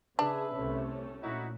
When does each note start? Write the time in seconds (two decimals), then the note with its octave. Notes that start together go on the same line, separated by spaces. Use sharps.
0.19 C#3 D4 G#4 B4 E5
0.55 C2 C3 A3 C#4
1.23 A#2 D#4 E4 F#4